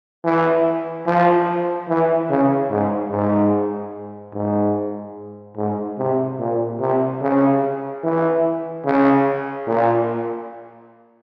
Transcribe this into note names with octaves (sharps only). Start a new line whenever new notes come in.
E3
F3
E3
C#3
G#2
G#2
G#2
G#2
C3
A#2
C3
C#3
E3
C#3
A#2